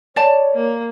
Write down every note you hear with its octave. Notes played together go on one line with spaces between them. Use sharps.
C#5 D5 A5
A#3